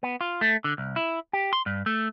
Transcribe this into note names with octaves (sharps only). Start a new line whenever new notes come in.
B3
F4
A3
D3
C2
E4
G4
C6
G2
A3